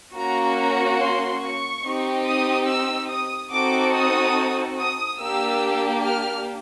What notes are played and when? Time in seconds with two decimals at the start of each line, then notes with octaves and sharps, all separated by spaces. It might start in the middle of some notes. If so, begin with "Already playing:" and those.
0.16 A#3 C#4 F#4 A#5
0.58 A#5
1.00 C6
1.42 C#6
1.84 C4 D#4 G4
2.26 D#6
2.68 E6
3.10 D#6
3.52 C4 D#4 F#4 A4 D6
3.94 D#6
4.78 D#6
5.20 A#3 D4 G4 E6
6.04 F6